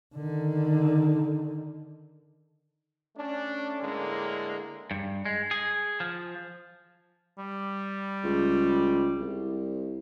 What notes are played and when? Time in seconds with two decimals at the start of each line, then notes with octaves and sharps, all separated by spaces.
0.15 D3 D#3
3.16 A3 C#4 D4
3.82 A2 D3 G#3 A#3
4.91 G2
5.26 G#3
5.51 G#4
6.00 F3
7.38 G3
8.24 C#2
9.20 C2